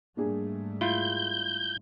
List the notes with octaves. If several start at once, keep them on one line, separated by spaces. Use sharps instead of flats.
G#2 G3 A3 A#3 D4 G#4
E4 F4 G6